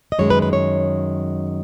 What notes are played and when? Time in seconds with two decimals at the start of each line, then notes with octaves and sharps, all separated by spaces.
0.12 D#5
0.19 F#2 D#3 G#3 C#5
0.30 B4
0.42 B4
0.53 C#5